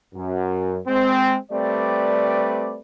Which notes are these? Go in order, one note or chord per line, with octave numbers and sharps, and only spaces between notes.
F#2
G#3 C4
G3 A3 C4 B4 D5